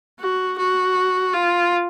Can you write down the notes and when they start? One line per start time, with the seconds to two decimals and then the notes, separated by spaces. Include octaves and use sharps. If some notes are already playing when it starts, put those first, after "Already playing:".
0.19 F#4
0.58 F#4
1.33 F4